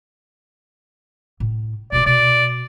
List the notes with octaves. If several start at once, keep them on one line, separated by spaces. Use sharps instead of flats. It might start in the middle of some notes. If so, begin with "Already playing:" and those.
A2
B2 A3 D5
B2 D5